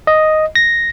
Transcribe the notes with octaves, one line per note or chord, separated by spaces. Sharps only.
D#5
A#6